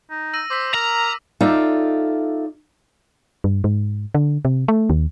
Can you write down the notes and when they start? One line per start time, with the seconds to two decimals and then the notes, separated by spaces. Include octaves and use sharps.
0.11 D#4
0.33 E6 A#6 D#7
0.50 C5 D6 E6 B6
0.74 A#4 A#5
1.41 D#4 F4 A4 D5 E5
3.44 G2
3.64 G#2
4.14 D3
4.45 C3
4.68 A3
4.90 D#2